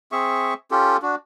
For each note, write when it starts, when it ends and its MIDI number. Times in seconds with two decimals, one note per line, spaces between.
0.12 0.54 60
0.12 0.54 68
0.12 0.54 76
0.12 0.54 85
0.71 0.97 61
0.71 0.97 65
0.71 0.97 67
0.71 0.97 69
1.02 1.15 62
1.02 1.15 66